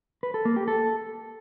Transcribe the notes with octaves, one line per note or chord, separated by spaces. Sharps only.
B4
A4
A#3
G4
A4